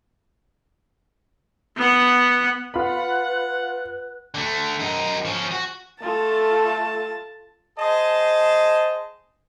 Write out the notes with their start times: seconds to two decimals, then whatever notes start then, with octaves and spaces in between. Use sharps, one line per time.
1.77 B3 F#5
2.74 F4 B4 F#5 B5
4.35 D3 A3
4.80 F#2 D#4
5.25 F3 C#4
5.51 F#4
6.02 A3 F4 A4 A5
7.79 G#4 C5 D#5 A5